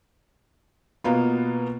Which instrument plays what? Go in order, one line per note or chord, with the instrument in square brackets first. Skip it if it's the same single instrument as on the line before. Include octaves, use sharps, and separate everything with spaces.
[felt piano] B2 A#3 B3 F4